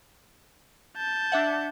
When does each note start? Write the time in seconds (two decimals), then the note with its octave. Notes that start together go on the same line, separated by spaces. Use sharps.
0.97 A5 G6
1.32 D4 E5 F#5